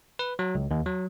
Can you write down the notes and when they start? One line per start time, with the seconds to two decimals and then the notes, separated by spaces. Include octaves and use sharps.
0.19 B4
0.39 F#3
0.55 C#2
0.71 D#2
0.86 F#3